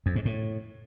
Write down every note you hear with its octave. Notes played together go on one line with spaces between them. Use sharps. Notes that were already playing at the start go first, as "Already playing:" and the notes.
F2
G#2
A2